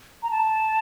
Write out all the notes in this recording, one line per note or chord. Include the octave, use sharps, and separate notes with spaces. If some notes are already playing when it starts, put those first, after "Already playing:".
A#5
A5